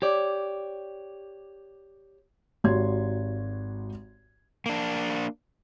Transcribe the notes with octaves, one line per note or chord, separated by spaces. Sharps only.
G4 C#5 D5
G#1 F#4 G4 C#5 C6 G#6
A#3 D4